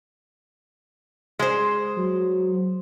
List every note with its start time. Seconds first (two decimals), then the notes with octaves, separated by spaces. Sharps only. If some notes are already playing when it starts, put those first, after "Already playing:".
1.39 G#3 C5
1.97 F#3